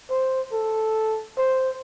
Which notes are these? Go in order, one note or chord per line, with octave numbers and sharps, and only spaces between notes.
C5
A4
C5